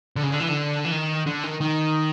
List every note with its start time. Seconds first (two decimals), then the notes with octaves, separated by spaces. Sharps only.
0.16 D3
0.23 C#3
0.30 D3
0.40 E3
0.49 D3
0.85 E3
0.92 D#3
1.26 D3
1.43 D#3
1.61 D#3